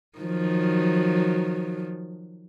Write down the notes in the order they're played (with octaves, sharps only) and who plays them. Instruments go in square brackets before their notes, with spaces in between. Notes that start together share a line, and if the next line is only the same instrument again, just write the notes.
[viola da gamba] D#3 F3 F#3